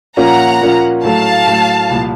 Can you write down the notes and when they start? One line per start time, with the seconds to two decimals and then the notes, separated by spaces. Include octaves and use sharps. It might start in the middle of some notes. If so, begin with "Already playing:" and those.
0.17 A#2 F3 A#3 C#4 F4 F#5 A#5
0.61 A#2 F3 A#3 C#4 F4
1.04 A2 F#3 A3 F5 A5
1.47 A2 F#3 A3
1.89 C2 A#2 F3